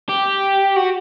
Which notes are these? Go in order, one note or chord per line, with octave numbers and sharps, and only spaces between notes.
G4
F#4